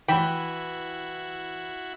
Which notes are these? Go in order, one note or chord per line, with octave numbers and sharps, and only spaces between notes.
E3 E4 F#4 G5 B5